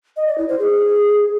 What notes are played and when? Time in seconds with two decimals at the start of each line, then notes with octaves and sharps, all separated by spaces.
0.17 D#5
0.27 D5
0.38 E4
0.49 C5
0.59 G#4